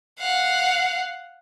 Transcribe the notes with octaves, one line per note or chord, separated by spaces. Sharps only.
F5 F#5